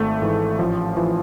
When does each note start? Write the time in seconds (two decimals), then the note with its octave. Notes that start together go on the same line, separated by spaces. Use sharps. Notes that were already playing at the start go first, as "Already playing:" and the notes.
Already playing: G#1 A3
0.22 G#2 E3
0.59 A1 F3
0.97 E3 F3